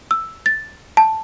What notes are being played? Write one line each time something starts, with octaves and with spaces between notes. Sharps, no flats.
E6
A6
A5